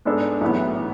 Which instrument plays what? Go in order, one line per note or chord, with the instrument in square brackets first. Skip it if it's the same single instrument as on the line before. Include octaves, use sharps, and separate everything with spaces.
[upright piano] G#2 G#3 B3 D4 A4
B1 A2 E3 B3